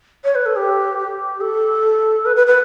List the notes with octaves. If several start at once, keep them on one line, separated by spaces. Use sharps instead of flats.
C#5
B4
A4
G4
G4
A4
B4
B4
B4